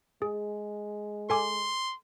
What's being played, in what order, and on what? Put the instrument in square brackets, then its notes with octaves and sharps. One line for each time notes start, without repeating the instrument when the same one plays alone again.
[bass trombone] G#3 [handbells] G#4
[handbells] A4 G#5 D6 [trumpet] C6